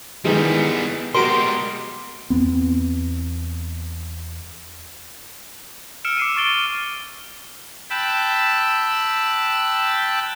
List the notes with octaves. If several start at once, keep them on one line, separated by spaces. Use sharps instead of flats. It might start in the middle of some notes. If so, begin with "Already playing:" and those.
D#3 E3 G3 G#3 B3
B2 G3 G#3 F#4 A#4 C6 D7
E2 B3 C4
E6 F6 C#7 D7 E7
D6 C7 D#7
C#6 D6 A6 D7 G7
G5 A5 B5 E6 F#6